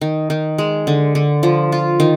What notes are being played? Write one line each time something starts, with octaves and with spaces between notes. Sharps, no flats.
D#3
D#3
G#3
D3
D3
F3
F4
D#3